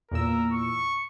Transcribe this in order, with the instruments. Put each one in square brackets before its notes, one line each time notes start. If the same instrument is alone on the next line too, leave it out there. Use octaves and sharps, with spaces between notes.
[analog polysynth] E2 A#2 E6 [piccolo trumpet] A#4
[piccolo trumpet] C#6